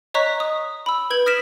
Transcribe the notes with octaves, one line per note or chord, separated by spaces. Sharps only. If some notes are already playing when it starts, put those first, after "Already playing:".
C#5 D#5 A#5 C#6 F#6 B6
D#6
B5 E6
B4 G6 G#6 D7 F#7
D#6 F6 A#6 B6 D7 E7